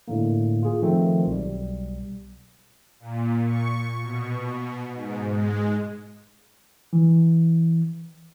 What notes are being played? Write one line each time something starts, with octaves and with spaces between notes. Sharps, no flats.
A2 D3 A#3
F4 G#4
D#3 F3 A3 C4
B1 G3
A#2
C#6
B2
G#2
G#3
E3